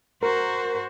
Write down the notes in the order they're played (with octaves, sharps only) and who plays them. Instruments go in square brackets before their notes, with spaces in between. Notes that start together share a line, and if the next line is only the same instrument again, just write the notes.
[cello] F#4 C5 [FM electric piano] A#4